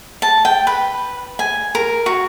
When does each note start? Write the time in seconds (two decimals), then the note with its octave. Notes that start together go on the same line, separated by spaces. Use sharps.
0.22 A5
0.45 G5
0.67 B4
1.39 G#5
1.75 A#4
2.06 F#4